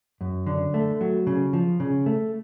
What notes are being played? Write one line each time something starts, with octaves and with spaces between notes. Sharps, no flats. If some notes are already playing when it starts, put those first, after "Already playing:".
F#2
D3
A3
F#3
C#3
F3
C#3
A3